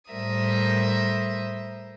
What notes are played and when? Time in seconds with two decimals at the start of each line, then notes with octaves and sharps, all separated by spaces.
0.11 A2 G3 A#4 C5 E5 D#6